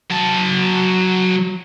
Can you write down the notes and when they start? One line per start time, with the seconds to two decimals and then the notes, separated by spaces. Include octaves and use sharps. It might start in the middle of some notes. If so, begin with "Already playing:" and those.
0.11 F#3 A5